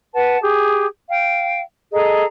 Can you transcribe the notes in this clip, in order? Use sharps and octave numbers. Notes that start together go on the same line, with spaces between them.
B4 F#5 A5
G4 G#4
F5 G5
G#4 A4 D#5 A#5